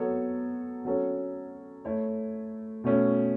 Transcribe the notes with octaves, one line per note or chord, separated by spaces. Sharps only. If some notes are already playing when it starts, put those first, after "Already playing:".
Already playing: F#3 B3 A4 C#5
F#3 C#4 A4 C#5
A3 E4 A4 C#5
B2 A3 C#4 E4